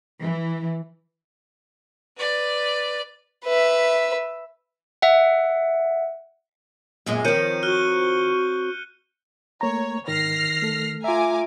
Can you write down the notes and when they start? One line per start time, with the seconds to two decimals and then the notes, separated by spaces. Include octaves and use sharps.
0.21 E3
2.17 B4 D5
3.45 B4 E5
5.02 E5 F#5
7.06 F#2 A#2 G#3 B3
7.25 D#3 F3 C4 A#4 C#5 G6 C#7 D#7
7.63 F#4 F6 F#6 G7
9.61 A3 A#3 C#5 A#5
10.08 G#2 D#3 F6 A#6 C7
10.62 A3 A4
11.04 F4 E5 G#5 A#5 D6